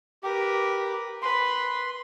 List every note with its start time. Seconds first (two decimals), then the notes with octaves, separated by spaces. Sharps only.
0.23 G4 A#4 B4
1.22 B4 C6